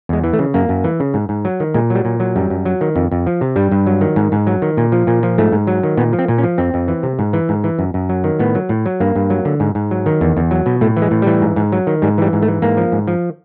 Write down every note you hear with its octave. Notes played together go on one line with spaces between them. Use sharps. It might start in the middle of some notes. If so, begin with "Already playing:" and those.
E2 G#3
E3
A3
C#3
F#2 A#3
F#2
E3
C#3
G#2
G#2
F#3
D#3
A#2 G#3
F#3 G3
A#2
F#3
F#2 G3
F#2
F#3
D#3
F2
F2
F3
C3
G2 G3
G2
F#3
D#3
G#2
G#2
F#3
D#3
A#2
F3
A#2
F3
G#2 A3
G#2
F#3
D#3
A#2 B3
F3
C4
A#2
C#4
F3
F2 C4
F2
E3
C3
G#2
E3
G#2
E3
F#2
F#2
F#3
D#3
A2 B3
F#3
A2
F#3
G2 A#3
G2
F#3
D3
G#2
G#2
F#3
D#3
E2
E2
F#3
B2
A2 A3
E3
G#3
A2
E3 G3
G#2
G#2
F#3
D#3
G#2 G3
E3 G3
G#2
A3
E3
G#2 A#3
F3
G#2
F3